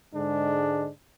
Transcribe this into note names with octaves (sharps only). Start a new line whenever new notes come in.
G#2 D3 G#3 D4